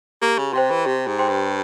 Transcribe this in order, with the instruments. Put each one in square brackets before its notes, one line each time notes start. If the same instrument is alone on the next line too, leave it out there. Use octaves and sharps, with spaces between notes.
[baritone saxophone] A#3 [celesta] G4
[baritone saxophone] C#3
[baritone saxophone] C3 [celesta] C5 G5 C6
[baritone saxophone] E3
[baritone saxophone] C3 [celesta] G4
[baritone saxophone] G#2
[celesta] C5 G5 C6
[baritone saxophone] G2